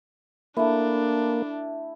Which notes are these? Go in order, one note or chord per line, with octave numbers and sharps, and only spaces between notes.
A3 A#3 D4 E4